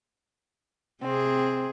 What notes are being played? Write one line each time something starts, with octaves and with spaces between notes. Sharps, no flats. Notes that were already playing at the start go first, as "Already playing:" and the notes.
C3 C4 G#4